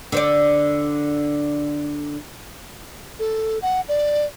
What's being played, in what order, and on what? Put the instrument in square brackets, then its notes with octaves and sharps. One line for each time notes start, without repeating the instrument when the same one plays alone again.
[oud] D3 C5 D5
[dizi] A4
F#5
D5